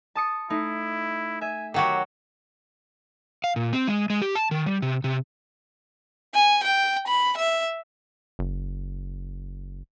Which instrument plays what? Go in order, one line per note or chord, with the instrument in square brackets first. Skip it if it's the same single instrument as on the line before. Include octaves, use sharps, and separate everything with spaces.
[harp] A5 D#6 C#7
[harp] A3 D#4 [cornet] E4
[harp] E5 [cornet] G#5
[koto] D#3 F#3 F#4 [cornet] G4
[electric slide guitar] F5
A#2
C4
G#3
G#3
G4
A5
D#3
G3
C3
C3
[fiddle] G#5
G5
B5
E5
[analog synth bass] F#1